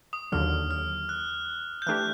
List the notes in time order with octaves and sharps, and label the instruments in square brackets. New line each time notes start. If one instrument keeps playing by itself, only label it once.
[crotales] D#6
[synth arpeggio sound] D#2 D3 F#3 [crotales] F6
[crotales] F6
F#6
G6
[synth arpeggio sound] E3 A3 D4 G4 [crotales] F#6